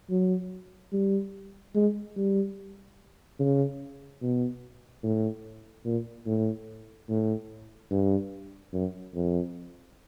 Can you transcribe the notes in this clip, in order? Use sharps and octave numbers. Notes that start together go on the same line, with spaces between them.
F#3
G3
G#3
G3
C#3
B2
A2
A#2
A2
A2
G2
F#2
F2